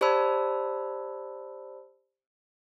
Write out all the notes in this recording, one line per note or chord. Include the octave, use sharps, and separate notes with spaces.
G4 C5 D5 A5 B5 E6